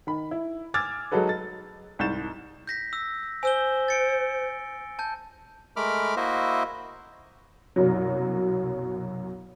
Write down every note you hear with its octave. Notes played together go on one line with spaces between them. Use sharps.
D#3 B5
E4
G#5 D6 E6 F6 G#6 A6
F#3 G#3 D#4 F#4 A4 B4
A6
C2 G#2 C#6 G6 A6 E7
G6 A#6 B6
E6
C5 G#5 E6 G7
A6 C#7 D7
A5 G6
G#3 A3 A#4 B5 D6 F6
A#3 E4 F#4 C5 D#5 E5
C2 F#2 B2 F#3